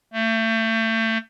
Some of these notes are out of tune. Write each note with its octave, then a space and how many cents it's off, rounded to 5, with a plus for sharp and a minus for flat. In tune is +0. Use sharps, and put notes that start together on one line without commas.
A3 +30